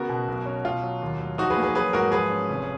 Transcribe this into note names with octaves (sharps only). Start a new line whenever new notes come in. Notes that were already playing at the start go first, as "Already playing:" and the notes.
Already playing: C#3 B3 F#4 A#4
B2
B1
C#4
B2 F4
F#3
D#2
F#3
F3 D#4 F#4
G#4 B4
A#3
G#4 B4
F#3 G#4 B4
G#2 F#4 A#4
F3 G#4 B4
C#4
F1